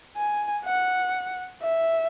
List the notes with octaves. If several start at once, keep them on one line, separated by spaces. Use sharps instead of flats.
G#5
F#5
E5